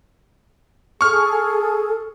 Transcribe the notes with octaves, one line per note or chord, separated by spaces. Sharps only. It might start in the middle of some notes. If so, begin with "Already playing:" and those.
G#4 A4 C#6 F6